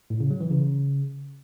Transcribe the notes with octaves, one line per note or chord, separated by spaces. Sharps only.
A2
C#3
F#3
E3
C#3